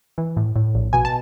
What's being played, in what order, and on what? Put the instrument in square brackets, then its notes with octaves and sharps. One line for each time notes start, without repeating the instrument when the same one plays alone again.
[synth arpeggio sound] E3
A2
A2
A#1
B2 G#5
A5